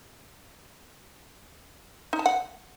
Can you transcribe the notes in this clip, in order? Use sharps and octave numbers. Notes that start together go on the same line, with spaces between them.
D#4
A5
F#5